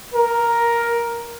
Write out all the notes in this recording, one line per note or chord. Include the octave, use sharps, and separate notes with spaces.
A#4